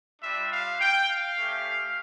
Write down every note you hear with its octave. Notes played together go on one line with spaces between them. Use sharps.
G3 D4 F4 E5
F5
G5
F5
A3 C#4 G4